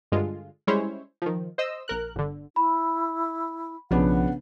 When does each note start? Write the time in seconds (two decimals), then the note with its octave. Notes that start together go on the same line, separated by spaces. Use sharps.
0.12 G2 D3 G#3 F4
0.67 G3 G#3 C#4 E4 C5 C#5
1.22 D#3 F3
1.58 C5 D#5 E6
1.88 A#1 A#4 F#6
2.16 G1 D3
2.56 E4 B5
3.91 B1 C#3 F3 B3 D4 F#5